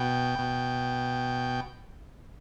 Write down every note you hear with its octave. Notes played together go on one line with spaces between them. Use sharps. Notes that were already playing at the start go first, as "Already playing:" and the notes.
Already playing: B2 G5
B2